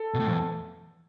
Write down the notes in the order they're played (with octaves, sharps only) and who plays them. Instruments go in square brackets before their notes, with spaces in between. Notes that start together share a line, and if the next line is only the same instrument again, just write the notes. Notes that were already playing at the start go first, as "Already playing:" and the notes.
Already playing: [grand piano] A4
[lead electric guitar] B2
A2
F2
E2